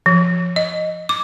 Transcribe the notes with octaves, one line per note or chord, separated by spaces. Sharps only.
F3
D#5
D6